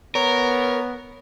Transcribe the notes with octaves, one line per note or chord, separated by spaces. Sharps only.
B3 A#4 C#5